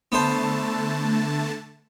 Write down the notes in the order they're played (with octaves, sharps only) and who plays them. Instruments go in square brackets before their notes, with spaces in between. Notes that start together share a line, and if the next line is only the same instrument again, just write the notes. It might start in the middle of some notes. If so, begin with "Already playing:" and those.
[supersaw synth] D3 A3 A5 [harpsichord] B3 C5